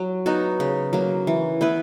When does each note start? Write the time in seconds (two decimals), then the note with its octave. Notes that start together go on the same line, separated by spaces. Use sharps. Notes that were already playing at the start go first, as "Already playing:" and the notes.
Already playing: F#3
0.26 B3 D#4 F#4
0.60 C#3
0.93 F#3 A#3
1.27 E3
1.61 B3 E4 B4